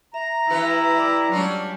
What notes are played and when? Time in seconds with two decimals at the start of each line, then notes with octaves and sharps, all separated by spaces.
0.14 E5 A#5
0.50 E3 E4 G4 B4
0.97 D5 D6 E6
1.32 F#3 G3 C#4 D4 F4